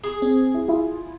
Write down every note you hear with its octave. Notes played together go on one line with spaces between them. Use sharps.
G#4
C4
E4
E4 F4